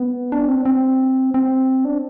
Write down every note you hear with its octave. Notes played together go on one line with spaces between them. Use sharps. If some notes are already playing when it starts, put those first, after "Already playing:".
Already playing: B3
D4
C4
C4
C4
D4